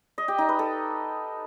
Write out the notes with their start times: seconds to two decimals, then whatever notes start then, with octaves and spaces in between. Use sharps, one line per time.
0.18 D#5
0.28 G4
0.38 D#4
0.49 B4
0.59 A4